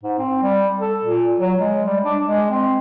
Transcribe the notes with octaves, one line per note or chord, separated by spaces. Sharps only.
G#2
C4
G3
A4
A#2
F#3
G#3
G3
D4
G#3
C4